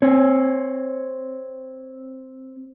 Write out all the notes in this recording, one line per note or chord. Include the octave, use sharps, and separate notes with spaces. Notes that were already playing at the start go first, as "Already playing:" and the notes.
C4 C#5